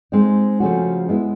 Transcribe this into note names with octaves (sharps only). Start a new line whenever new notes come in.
G#3 C4 D#4
C#3 F3 A3 C#4 F#4
G#3 B3 E4